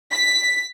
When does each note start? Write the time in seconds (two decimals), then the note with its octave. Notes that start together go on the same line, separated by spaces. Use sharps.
0.12 B6